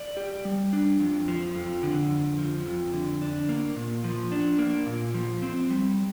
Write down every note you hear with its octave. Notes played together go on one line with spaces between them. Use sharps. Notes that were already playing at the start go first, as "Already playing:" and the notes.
Already playing: D5
G4
G3
D4
F2
F3
F2
D3
F2
F3
F2
D3
D4
A#3
A#2
F3
D4
A#3
A#2
F3
C4
G3